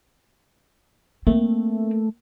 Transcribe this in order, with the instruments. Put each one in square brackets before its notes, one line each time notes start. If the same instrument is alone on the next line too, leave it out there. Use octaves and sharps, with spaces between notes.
[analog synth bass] A3 [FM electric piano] A#3 [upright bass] C4